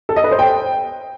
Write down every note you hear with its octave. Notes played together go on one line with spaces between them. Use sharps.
A4
D#5
B4
C5
G5